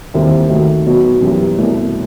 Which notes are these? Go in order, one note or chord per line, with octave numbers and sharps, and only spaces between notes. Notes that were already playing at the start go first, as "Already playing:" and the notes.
D#2 D#3 G3 C4 E4
D#3 A3 D#4 F#4
B2 F#3 B3 D#4 F#4
F#2 E3 G3 B3
C2 B2 A3